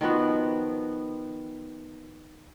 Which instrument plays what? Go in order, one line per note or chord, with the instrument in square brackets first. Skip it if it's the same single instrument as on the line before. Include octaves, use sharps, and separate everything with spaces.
[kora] D#3 F3 B3 F#4